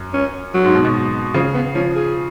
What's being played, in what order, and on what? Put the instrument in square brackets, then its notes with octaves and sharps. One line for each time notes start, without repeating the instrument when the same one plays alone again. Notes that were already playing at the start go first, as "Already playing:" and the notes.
Already playing: [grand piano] F#2
[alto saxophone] C#4
F#3
[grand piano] G#2
B2
B2
[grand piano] C#3 [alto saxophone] F3
[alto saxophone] B3
[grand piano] F3 [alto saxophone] C#4
[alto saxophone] G#4